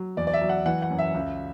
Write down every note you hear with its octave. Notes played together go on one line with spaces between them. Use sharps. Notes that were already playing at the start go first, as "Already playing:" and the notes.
Already playing: F#3
E2 D5
D5
E5
F#3
F#5
E3 F#5
F#5
F#2
E5
C#2